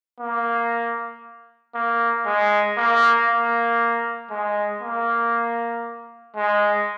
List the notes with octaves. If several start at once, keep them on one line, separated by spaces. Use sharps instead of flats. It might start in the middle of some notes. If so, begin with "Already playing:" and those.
A#3
A#3
G#3
A#3
A#3
G#3
A#3
G#3